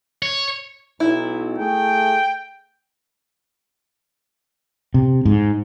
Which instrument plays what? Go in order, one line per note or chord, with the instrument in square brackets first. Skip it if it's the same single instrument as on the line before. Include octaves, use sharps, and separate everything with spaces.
[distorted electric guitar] C#5
[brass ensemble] B1 [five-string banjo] E4
[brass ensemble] A3 G#4 [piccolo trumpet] G5
[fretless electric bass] C3
G#2